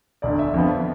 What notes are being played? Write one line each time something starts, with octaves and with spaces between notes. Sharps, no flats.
E1 D2 D3 D5
E5
F2 D3 F3 B3